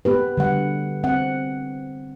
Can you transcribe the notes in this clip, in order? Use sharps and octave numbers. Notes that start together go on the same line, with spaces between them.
B3 G4 B4
D3 G3 F#5
C4 F#5